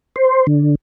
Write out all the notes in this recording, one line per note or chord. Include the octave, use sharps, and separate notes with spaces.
C5
D3